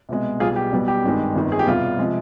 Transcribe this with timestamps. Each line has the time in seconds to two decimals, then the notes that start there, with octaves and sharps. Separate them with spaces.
0.09 C2 B2 G#3
0.40 B1 B2 G3 F4 G#4
0.56 G4
0.72 B1 B2 G3
0.88 G4
1.03 G#1 G2 D#3 G#3
1.36 G1 F2 D#3
1.52 G#4
1.59 G4
1.67 C2 B2 G3 F4
1.99 C3 F3 G#3